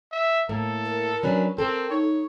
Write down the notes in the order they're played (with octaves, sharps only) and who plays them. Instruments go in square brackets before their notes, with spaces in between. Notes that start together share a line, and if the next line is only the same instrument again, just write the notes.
[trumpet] E5
[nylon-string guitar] A2 A#3 [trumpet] A4
[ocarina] A#4
[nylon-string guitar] F#3 C#4 D4 [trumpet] B4
[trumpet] C4 [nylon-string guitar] A4 [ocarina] A#4
[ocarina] D#4 [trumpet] C#5